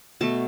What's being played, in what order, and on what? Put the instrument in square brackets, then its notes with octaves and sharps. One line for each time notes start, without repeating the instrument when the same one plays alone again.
[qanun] B2 A3 A5